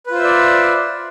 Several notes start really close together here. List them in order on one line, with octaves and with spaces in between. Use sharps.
B4 F4 C5 E5 D5